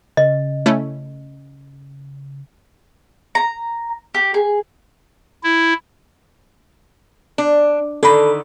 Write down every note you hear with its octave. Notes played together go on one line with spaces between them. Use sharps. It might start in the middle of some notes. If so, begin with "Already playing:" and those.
C#3 D#5
A3 C#4 E4
A#5
G4
G#4
E4
D4
D3 D#3 A4 B5